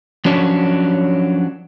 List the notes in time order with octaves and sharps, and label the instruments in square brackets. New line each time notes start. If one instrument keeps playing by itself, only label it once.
[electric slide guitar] F3 F#3 C#4 D4 C#5